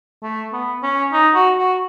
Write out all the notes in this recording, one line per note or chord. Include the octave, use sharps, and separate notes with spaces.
A3
B3
C#4
D#4
F#4
F#4